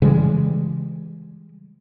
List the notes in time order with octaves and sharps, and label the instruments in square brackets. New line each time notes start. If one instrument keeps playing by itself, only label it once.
[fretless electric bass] C#3 E3 G3 G#3